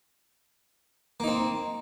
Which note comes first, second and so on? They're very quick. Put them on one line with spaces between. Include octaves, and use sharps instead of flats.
A#3 D#4 C4